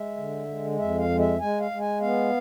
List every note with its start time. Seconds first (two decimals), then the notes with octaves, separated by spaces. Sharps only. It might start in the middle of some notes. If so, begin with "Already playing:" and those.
Already playing: G#3 E5
0.17 D3
0.48 G#3
0.78 F2 E5
0.98 F5
1.09 G#3
1.19 E5
1.39 G#3 G#5
1.60 F5
1.71 G#3
1.80 G#5
2.00 B3 F5